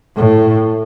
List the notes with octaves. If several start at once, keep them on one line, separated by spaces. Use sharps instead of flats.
A2